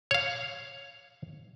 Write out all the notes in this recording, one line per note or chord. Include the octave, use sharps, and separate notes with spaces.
C#5 F5